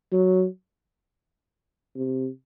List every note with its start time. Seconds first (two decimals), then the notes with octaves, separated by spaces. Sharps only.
0.13 F#3
1.96 C3